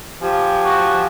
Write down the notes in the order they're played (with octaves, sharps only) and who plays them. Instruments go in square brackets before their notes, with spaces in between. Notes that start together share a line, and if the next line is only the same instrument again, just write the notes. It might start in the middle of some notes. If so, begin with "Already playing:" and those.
[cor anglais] F3 [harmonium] G4 G#5
[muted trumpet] F#4